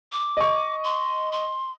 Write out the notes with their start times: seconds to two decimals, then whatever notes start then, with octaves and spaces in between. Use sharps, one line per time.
0.12 D6
0.37 D#5 C#6
0.84 C6
1.32 C6